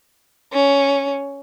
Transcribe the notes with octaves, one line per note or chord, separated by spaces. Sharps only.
C#4